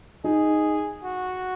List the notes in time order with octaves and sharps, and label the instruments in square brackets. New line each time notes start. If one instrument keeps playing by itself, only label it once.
[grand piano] D#4 [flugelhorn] G#4
[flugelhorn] F#4